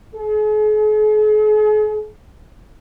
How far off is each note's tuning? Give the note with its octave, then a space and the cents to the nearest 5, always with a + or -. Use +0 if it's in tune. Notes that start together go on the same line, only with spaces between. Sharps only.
G#4 +45